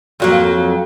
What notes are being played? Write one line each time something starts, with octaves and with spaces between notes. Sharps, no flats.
F2 F#3 A#3